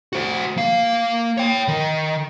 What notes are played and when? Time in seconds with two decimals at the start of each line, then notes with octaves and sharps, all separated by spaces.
0.13 F#4 C5
0.57 A#3 F5
1.37 C#5 G5
1.68 D#3